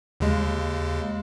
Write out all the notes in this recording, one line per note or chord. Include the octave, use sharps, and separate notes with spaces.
D#2 C#3 G#3